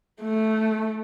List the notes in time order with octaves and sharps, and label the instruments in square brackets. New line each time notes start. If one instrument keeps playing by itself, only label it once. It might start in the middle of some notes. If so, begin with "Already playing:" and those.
[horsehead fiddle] A3